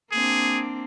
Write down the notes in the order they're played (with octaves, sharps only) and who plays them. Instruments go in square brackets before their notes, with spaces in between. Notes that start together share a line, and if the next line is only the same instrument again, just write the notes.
[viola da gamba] A#3 C4 D4 [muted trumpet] G#4